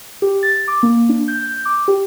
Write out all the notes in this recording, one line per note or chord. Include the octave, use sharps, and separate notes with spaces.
G4
A6
D6
A#3
D4
G6
D6
G4